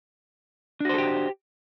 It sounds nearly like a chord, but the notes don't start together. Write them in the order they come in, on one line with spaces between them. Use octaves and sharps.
D4 F#4 C5 A4 G4